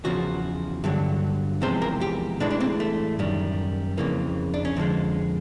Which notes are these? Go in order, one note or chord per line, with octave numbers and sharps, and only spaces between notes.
E2 C#3 F3 F#4
G2 D3 F#3
E2 C3 F3 G#3 C5
A#4
G4
A2 E3 G#3 D4
D4
C4
A3
F#2 D#3 G3
F2 C#3 E3 A#3
D4
C#4
F2 D3 F3 G#3 C4